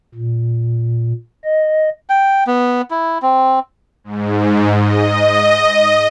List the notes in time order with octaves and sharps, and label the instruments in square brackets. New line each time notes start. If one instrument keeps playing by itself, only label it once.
[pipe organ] A#2
D#5
[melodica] G5
B3
E4
C4
[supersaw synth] G#2
D#5